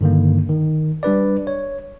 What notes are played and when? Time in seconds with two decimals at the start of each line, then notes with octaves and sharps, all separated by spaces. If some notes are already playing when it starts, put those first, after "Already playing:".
0.01 G2 D3 D#3 A#3
0.49 D#3
1.03 G3 D4 B4 D5
1.47 C#5